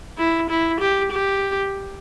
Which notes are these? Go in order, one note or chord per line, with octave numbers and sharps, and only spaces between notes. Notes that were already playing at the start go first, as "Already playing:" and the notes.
E4
E4
G4
G4